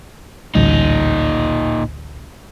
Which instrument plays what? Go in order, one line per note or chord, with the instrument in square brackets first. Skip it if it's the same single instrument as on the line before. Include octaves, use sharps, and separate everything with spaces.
[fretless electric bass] A1 D2 G3 [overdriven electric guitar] A#2 D#4